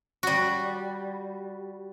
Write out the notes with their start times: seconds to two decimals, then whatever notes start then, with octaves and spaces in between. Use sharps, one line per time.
0.23 G3 F#4